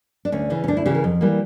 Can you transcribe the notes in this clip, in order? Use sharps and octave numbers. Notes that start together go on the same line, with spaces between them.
D4
D2 C#4
C#3 E3
C#4
D2 D4
E4
C#3 E3 G4
A#4
F2
E3 G3 A#3